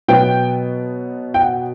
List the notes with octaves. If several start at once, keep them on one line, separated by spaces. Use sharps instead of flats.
B2 F#3 B3 G5
G5
F#5